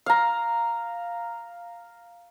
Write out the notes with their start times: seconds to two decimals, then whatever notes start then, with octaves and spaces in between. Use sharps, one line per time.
0.06 F5 A#5